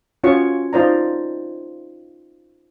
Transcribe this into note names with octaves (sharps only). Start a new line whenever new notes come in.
C#4 F4 F#4 C#5 C#6
D#4 F4 C5 D5 A#5